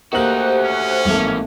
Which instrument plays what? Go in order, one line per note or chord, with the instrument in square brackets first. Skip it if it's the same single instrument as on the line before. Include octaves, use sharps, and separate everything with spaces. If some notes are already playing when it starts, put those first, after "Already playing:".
[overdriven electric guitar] A3 F#4 [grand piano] A#3 F#7 [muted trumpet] D#4 [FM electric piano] G4 C5 F#6
[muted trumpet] C#4
[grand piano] G#1 A3 [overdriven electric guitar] E3 A#3